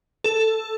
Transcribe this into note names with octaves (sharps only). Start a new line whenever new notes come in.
A4